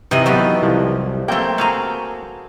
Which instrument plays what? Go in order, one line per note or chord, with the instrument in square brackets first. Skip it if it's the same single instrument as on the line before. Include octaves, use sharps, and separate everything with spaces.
[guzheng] C3 D#5 [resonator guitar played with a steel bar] E3 [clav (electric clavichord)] D#4 C5
[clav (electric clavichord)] D#3 B3 [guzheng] F#3 G4 A4
[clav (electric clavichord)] C2 F3
[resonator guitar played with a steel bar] A3 G5 [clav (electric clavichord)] A#3 C4 C5
[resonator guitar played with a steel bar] A3 A#5 [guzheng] F#4 G#4 F5